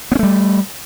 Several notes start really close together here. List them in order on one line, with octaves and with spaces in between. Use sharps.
B3 C#4 A3 G3